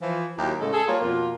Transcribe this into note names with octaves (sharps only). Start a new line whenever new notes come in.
E3 F3
D#2 F#3 E4 G4
A2 C#3 G#3 A4
G#4 A4
G3 A#3 F4 A4 A#4 C#5
F2 B2 A#3 F4